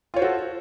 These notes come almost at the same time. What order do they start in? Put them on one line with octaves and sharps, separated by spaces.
F4 C#5 C5 F#4 A4